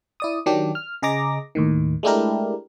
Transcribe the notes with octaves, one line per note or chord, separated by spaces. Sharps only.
E4 D5 D#6
D#3 F#3 D4 G4
F6
C#3 G#4 D#5 A#5 D6 A#6
D#2 A2 D#3
G#3 A3 D4 E4 G4 A#4